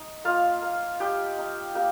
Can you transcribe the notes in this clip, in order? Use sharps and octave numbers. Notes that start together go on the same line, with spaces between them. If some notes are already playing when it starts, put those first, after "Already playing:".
Already playing: D#4
A#3 F4 F5
A#3
D#4 G4 G5
D#4
A#3 G4 G5